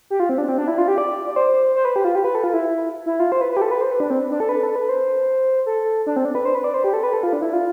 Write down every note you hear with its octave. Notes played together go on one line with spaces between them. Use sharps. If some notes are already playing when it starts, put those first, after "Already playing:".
G4
F4
C4
D4
C4
D4
E4
F4
G4
D5
D5
C5
C5
B4
G4
F4
G4
B4
A4
F4
E4
E4
F4
C5
B4
B4
G4
A4
B4
C5
B4
D4
C4
D4
A4
B4
A4
B4
C5
A4
D4
C4
D4
B4
C5
B4
D5
C5
G4
A4
B4
A4
F4
D4
E4
F4